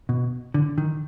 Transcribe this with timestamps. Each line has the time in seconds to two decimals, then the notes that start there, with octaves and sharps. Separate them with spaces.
0.09 B2
0.54 D3
0.78 D#3